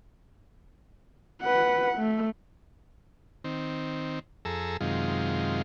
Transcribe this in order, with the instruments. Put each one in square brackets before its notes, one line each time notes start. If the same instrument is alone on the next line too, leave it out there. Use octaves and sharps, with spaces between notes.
[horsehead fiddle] B4 F#5
A3
[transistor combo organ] D#3 C4
F2 G#4 A4 A#5 E6
F#2 C3 D#3 G#3 F4